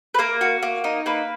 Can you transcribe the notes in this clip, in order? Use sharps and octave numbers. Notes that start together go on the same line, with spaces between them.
B4
A#3 A#4
F#4
A#3
D#4
A#3 B4